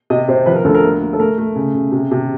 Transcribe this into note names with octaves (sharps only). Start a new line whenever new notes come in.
C3 D#5
C3 C5
F3 B4
A#4
D2 A4
A#4
A#3
A#3
A4
A3 A#4
A3
C#3
C#3
C3
C3